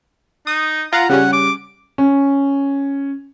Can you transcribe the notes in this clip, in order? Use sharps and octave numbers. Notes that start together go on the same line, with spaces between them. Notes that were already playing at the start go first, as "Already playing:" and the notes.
D#4 D#6
F4 F5 F#5 A#5
C#3 G3 C#4 F#5
D6
C#4